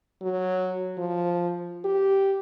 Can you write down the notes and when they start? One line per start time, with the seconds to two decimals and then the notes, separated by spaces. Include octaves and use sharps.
0.22 F#3
0.98 F3
1.84 G4